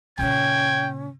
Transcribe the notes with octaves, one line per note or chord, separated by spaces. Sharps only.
A#2 C#3 C#4 G5 G#6